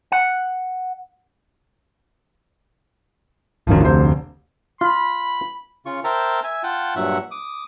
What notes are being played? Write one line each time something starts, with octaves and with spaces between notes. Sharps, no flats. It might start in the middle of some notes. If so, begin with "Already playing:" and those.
F#5
D1 G1 F#2 D#3 F3
F1 D2 C3 C5
F4 B5
C#3 F4 C#6
A#4 C5 E5 G5 A5 A#5
E5 G#5
F4 F#5 G5 A5
G2 A#2 F#3 E5 F#5 C#6
D6 D#6